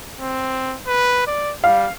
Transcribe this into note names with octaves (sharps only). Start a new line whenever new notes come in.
C4
B4
D5
G3 F5